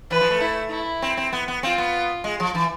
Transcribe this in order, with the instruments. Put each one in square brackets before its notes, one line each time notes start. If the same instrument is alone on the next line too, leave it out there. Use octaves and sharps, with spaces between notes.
[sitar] E3 [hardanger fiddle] B4
[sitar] F3
A3
[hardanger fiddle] E4
E4
[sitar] C4
C4
B3
B3
[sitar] C4 [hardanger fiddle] F4
[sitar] B3
G#3
F3
E3